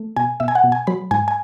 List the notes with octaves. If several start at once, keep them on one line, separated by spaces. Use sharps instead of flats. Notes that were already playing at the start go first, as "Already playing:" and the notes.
Already playing: A3
B2 G#5
B2 E5
G#5
F#5
B2
G#5
F#3 B5
G#2 G#5
G#5